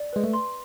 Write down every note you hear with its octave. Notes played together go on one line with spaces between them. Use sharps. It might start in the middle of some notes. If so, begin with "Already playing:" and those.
Already playing: D5
G#3 B4
A3
C6